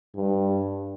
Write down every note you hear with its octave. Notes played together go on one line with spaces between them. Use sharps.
G2